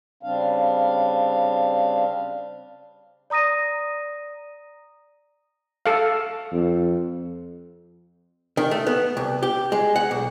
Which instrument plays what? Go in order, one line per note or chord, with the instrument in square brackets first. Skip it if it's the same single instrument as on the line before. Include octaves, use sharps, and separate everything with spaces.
[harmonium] C#3 G3 C4 D4 F5
[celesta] D5 A#5 D#6 A#6 D#7
[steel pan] A4 F5
[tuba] F2
[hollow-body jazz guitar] D#3
A3
B3
C2
G4
G#3
F#5
B1